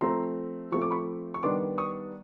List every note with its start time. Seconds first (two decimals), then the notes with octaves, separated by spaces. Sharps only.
0.01 F3 A3 C4 A#5 C6
0.72 F3 A3 C4 C#6
0.81 D6
0.90 B5 C#6
1.34 C#6
1.43 D#3 G3 B3 D4 C6 D6
1.78 C#6 D#6